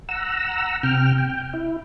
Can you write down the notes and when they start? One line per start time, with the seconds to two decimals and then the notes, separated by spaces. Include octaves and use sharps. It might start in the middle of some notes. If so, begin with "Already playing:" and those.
0.09 F#5 A#5 E6
0.83 C3 G5 F6
1.18 G5
1.53 E4